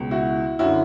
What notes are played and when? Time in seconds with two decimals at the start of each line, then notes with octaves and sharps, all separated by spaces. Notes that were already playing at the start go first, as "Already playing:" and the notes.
Already playing: C#2 B2
0.11 E4 F#4
0.59 F#2 D3 E4 F#4